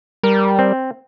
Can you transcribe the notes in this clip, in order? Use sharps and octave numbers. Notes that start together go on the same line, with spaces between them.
G3 A#4
C4